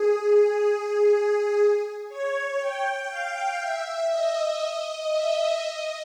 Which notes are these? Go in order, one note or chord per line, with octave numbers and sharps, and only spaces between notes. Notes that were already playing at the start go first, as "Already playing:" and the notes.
Already playing: G#4
G#4
C#5
G5
F5
E5
D#5
D#5
E5
D#5